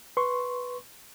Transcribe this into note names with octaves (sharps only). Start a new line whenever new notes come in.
B4 C6 C#6